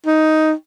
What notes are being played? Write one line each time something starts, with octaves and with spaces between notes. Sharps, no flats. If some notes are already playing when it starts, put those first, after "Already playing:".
D#4